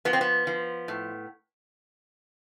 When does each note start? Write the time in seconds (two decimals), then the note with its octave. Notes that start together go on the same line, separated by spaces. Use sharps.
0.05 F3 B3
0.13 C4
0.21 B3
0.47 F3
0.88 A2